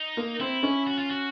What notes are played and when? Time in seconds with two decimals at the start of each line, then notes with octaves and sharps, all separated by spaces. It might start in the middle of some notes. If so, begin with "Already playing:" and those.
Already playing: D#4
0.17 A#3
0.40 C4 E4
0.63 C#4
0.87 F#4
0.99 F4
1.10 F#4